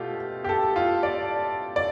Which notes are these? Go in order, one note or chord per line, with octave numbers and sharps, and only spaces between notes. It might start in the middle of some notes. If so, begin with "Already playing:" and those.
Already playing: B2 A3 F4 G4
G4
A4
F4
D5
D5